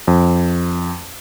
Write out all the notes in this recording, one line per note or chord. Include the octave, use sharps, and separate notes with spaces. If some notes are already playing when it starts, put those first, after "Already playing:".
F2